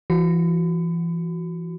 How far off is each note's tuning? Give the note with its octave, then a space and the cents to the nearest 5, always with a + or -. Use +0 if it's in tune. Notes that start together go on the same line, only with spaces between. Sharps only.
E3 +35 F#4 +0